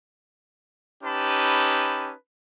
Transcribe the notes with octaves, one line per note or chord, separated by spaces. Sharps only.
C#4 D#4 G4 B4 A5 B5